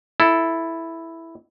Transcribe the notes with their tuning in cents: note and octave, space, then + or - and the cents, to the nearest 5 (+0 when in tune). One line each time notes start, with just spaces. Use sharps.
E4 +0 A4 +0